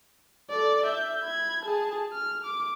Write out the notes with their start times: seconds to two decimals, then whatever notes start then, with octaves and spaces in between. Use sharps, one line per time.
0.50 A4 D5
0.85 E5 G6
1.23 B5 G#6
1.64 G#4 A5
2.13 F6
2.44 D6